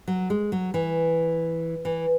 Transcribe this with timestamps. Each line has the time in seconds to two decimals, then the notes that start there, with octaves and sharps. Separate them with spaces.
0.07 F#3
0.30 G#3
0.52 F#3
0.74 E3
1.85 E3